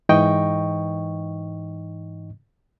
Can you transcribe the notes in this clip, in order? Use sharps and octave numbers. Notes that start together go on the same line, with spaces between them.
G#2 E3 D#4 D#5 G5 C#6